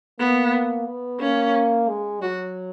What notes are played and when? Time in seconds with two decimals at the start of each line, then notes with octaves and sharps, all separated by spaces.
0.19 A#3 B3
0.87 B3
1.20 A#3 C#4
1.88 G#3
2.22 F#3 F#4